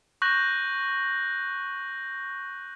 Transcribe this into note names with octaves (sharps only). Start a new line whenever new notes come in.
C#6 F#6 G6 A#6 F#7